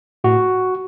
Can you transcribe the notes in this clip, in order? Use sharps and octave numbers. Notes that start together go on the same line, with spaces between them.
A2 F#4